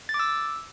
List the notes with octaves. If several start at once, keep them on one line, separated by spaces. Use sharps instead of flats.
A6
D6
E6